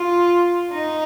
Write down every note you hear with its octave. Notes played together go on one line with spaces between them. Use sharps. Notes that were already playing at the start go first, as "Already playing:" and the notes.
Already playing: F4
D#4